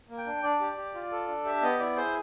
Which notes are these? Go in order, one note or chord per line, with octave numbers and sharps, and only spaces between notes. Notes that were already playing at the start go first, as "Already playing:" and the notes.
A#3
G5
D4
D4 D5
G4
G4
F4
A4
D4
G4 E5
B3 D#5
E4 D5
G#4 C5